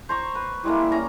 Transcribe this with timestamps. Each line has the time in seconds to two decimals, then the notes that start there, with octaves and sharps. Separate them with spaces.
0.09 C5 A#5 C#6
0.35 B4
0.63 G3 G#3 A#3 E4
0.92 C#4 A#5